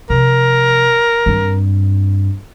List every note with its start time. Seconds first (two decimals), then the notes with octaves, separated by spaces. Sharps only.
0.10 C3 F3 A#4
1.26 G2 C4